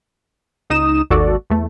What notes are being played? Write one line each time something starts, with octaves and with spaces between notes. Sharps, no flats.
C#2 D#4 D#6 E7
G#1 D#2 F#4 A4 D5
E2 A3